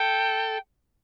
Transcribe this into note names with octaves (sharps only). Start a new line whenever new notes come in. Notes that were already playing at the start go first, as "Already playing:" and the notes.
Already playing: A4 G5